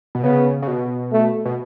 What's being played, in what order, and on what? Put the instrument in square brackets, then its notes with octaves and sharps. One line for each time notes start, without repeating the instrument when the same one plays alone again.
[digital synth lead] B2
[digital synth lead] C#3 [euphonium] B3
[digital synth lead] C#3
B2
[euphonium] A3
[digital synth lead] B2